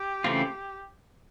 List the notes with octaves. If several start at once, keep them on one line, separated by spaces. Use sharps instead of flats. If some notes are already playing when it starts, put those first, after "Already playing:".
Already playing: G4
C#3 E3 A3 C4 F4